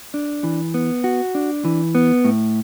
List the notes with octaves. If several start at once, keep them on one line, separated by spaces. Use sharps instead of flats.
D4
E3
B3
F#4
D4
E3
B3
A2